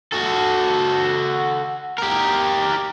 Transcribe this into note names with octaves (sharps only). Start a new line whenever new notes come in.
F#4 A4
G4 A#4